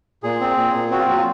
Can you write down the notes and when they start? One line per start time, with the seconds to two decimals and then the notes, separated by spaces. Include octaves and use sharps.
0.23 A#2 G#4
0.41 C4
0.57 A#2
0.74 A#2
0.91 C4 F#4
0.99 F4
1.08 F#3 F#4
1.17 F4